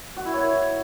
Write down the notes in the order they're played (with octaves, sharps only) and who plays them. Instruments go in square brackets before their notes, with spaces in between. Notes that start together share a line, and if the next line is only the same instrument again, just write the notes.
[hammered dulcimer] F#4
E4
C#5